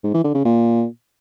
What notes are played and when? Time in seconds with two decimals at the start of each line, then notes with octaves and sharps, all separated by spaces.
0.03 G#2
0.14 E3
0.24 D3
0.34 C#3
0.45 A#2